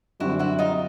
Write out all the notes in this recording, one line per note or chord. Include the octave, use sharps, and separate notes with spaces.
F#2 D3 G3 C4 E4 F#4
E4 F#4
D#4 F4